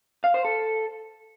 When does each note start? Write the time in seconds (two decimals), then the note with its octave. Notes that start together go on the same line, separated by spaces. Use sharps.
0.24 F5
0.34 C5
0.45 A4